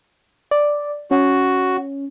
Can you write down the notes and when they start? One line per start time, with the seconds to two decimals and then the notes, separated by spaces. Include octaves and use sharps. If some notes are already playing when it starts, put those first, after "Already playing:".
0.51 D5
1.11 C#4 F#4